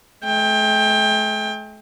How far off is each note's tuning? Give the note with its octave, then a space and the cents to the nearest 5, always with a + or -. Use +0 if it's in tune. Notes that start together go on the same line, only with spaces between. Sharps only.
A3 -45 G5 +20